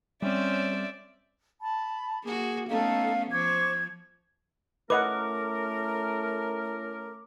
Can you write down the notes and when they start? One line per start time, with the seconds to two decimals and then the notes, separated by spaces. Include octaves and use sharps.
0.22 G3 C4 C#4 C5 D5 E5
1.61 A5 B5
2.24 A#3 F#4 G#4
2.69 A3 B3 C#4 D#4 A4 F5
3.32 F3 C5 C#6 D6 G#6
4.90 A3 C#4 E4 A#4 B4 D#5 F#5 D6